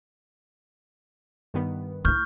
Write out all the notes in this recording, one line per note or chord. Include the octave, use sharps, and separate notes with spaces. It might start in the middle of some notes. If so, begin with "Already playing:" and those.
G2 D#3 B3
A3 E4 C#6 F6 G6